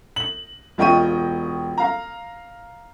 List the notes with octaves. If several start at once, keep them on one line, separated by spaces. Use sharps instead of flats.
F#7
E1 F4 D#5 G5 C#6 D#7
F5 A#5